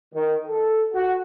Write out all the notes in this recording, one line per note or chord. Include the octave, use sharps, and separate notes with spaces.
D#3
A4
F#4